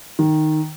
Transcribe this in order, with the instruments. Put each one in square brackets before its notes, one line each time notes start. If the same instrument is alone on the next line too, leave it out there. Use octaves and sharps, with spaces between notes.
[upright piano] D#3